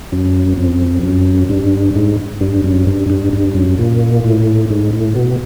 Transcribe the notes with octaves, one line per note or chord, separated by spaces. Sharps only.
F#2
F2
F#2
G2
G#2
G2
F#2
G2
G2
G2
F#2
A#2
A2
G#2
A2
B2